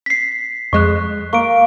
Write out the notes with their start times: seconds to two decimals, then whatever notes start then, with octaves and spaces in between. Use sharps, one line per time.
0.06 B6 C7
0.73 F2 G#3 C#6 F#6
1.33 A#3 C#6 D7